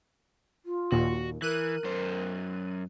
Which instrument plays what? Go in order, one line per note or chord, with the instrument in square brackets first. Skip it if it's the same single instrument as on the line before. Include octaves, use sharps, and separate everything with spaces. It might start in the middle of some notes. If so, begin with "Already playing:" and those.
[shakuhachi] F4
[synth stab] D#2 A#2 [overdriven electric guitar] F#4
[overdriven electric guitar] E3 [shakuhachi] A#4 [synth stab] F#6 D#7
[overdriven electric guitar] F#2 C5